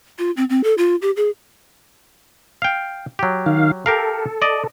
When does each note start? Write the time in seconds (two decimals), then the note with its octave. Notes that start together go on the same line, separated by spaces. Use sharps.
0.19 F4
0.37 C4
0.50 C4
0.64 A4
0.78 F4
1.02 G4
1.17 G#4
2.62 F5 G5
3.19 F#3 G4
3.46 D#3 F5
3.86 G4 A4 A#4 F5
4.42 D5 D#5